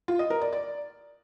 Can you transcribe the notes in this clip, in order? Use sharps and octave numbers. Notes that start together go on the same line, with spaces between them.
F4
D#5
A#4
D5
D5